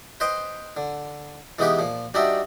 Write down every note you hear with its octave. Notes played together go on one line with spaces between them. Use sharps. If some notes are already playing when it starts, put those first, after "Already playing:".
B4 C5 D#5 G5 C6
D3
E3 G#3 B3 D#4 G4 B4
A#2 F3
G3 D4 D#4 F#4 E5 G5